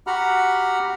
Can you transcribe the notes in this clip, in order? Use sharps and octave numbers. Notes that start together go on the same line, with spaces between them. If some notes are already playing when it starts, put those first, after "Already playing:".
F#4 G4 F#5 A#5 B5 F6